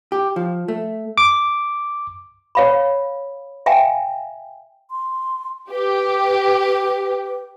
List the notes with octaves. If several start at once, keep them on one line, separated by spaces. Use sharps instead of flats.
G4
F3
A3
D6
C#5 F5 B5
E5 F5 G5 G#5 A#5
C6
G4 B4